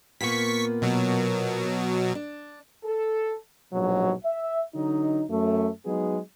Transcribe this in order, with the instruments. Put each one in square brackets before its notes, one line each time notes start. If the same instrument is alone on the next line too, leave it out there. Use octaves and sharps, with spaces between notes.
[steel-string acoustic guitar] A#2 A#3 B3 [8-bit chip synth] C#6 B6
[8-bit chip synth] B2 F#3
[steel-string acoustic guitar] D4
[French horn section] A4
[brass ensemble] A#1 G#2 B2 F#3
E5
D3 F#3 D#4
F#2 A3
F#3 G#3 B3 D#4 G#4